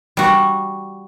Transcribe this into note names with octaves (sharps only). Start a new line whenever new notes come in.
G3 F#4